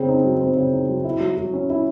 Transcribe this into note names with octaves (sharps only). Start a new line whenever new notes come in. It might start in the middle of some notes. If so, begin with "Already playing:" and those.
Already playing: C#3 C4
D#4
F#3
C4
C#3
D#4
F#3
E4
F#3
F#3
C#4
E4